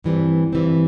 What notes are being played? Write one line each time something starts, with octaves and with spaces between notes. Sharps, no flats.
G2 E3 G3 C4
G2 E3 G3 C4